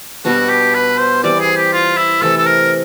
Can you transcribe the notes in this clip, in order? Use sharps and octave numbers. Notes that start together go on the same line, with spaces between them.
B2 G3 B3 D4 F#4
G4
B4
C5
E3 G3 C4 D5
G#4
G4
F4
E4
C3 E3 A3 A4
A4
A#4